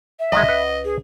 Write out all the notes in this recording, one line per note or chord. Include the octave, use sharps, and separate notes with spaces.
E5
C#2 F#2 D#3 G#3 D#5
B4 F#5
G#4